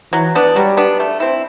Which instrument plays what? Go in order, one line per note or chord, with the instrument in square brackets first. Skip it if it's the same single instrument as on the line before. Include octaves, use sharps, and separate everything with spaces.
[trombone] E3 [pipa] F#3
[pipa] B3 D4
[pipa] F#3 [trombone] G3
[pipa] B3 D4
A3
C4 E4